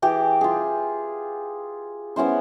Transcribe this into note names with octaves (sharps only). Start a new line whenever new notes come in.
E3 G4 G#4
F4 G#4
B3 C#4 E4 C5